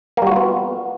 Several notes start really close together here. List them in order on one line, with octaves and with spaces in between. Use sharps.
A#3 G3 F#4 F4 B3